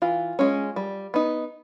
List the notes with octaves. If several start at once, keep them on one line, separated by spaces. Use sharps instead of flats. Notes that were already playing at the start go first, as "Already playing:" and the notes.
E3 F4
G#3 C#4
G3
B3 D#4